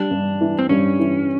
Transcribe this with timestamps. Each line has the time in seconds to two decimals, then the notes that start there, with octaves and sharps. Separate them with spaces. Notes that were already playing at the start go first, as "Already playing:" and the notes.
Already playing: G3 D4
0.11 G2
0.41 E3
0.59 C4
0.69 G2 C#4
1.00 E3